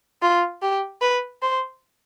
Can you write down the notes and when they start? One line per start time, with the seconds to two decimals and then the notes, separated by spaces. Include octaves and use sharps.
0.22 F4
0.62 G4
1.02 B4
1.42 C5